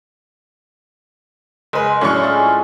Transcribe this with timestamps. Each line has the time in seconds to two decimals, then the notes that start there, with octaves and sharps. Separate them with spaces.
1.73 F#1 G#3 B4
2.01 A2 F#3 C#4 D4 C#6
2.23 G#3 F4